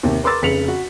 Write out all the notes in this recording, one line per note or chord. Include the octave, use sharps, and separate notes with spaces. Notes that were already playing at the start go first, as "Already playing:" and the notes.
D#2 C3
A#4 B4 C6 D6 E6 A6
F1 C#3 B6 C#7 F7 F#7
F#4